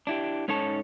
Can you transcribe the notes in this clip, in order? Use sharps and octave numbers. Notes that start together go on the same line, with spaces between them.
D4 E4 G4
G#2 C#4 D#4 A4 C#5 A5